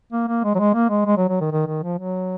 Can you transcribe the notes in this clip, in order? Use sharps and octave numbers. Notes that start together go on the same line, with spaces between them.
A#3
A#3
G#3
F#3
G#3
A#3
G#3
G#3
F#3
F#3
D#3
D#3
D#3
F3
F#3